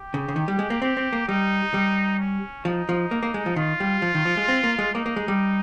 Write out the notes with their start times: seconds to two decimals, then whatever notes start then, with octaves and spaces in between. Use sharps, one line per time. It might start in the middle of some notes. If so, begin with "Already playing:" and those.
Already playing: G4
0.14 C#3
0.28 C#3
0.36 D#3
0.48 G3
0.59 G#3
0.70 A#3
0.82 C4 G4
0.97 C4
1.13 A#3
1.28 G3 D#4
1.74 G3
2.19 C#4
2.65 F3 D#4
2.89 F3
3.11 A#3
3.23 A#3
3.34 G#3
3.46 F3
3.56 D#3 F4
3.80 G3
4.02 F3
4.15 D#3
4.25 F3
4.37 G#3
4.48 C4
4.64 A#3
4.79 G#3
4.94 A#3 D#4
5.06 A#3
5.16 G#3
5.28 G3